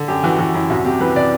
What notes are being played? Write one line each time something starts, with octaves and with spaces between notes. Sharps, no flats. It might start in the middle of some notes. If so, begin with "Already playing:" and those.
Already playing: D3
F#2 G4
E3 F#4
E3 F#4
F#2 E4
C2 F#4
C3 G4
E3 B4
C3 D5